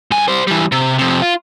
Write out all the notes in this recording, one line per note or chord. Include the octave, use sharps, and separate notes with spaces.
G2 G#5
G3 C5
E3 G3
C3
F2 C3
F4